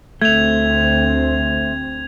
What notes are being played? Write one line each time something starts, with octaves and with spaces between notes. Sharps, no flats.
D2 A3 C4 G#6 F7